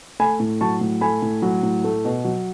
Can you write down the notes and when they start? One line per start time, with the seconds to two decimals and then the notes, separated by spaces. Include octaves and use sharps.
0.20 A3 G#5 B5
0.40 A2
0.61 F#3 A5 C#6
0.81 A2
1.01 A3 G#5 B5
1.22 A2
1.42 F#3
1.63 A2
1.84 A3
2.05 B2
2.25 F#3